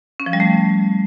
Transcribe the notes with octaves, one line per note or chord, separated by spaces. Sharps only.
C#4
F3
G3
A3